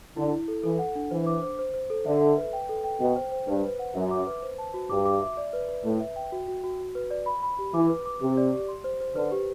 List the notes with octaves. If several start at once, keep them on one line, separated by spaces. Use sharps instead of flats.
D3 E4
E4
A4
E3 A4
F#5
D4
E3 C5
D6
C5
C5
C5
A4
D3 E5
E5
B4
G5
A4
G5
B2 G5
C5
C5
G2 B4
B4
F#5
F#2 E5
D6
B4
C5
A5
F#4
G2 D6
D6
E5
D5
B4
B4
A2 B4
E5
G5
F#4
F#4
F#4
F#4
B4
D5
B5
B5
G4
E3 D6
B4
D6
C3 G4
D5
G4
C6
C5
C5
D3 B4
G4